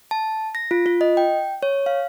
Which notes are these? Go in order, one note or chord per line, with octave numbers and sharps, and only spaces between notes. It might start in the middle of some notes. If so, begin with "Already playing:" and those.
A5
A#6
F4
F4
D#5
G5
C#5
F5